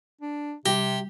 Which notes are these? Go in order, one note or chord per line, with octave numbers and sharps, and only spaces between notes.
D4
C3 G3 G4